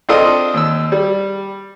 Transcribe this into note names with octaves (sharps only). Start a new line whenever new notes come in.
C4 D4 F4 A4 D#5
D#2 E6
G3